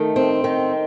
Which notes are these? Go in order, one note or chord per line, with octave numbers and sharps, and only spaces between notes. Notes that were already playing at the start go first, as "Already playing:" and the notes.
Already playing: D#3 A3
C4
D#3